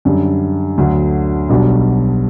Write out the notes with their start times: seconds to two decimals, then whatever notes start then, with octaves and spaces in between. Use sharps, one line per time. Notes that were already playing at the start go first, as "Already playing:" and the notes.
0.05 F#2 D3 G3
0.78 D2 D3 F#3
1.49 B1 B2 G3 D4 F#4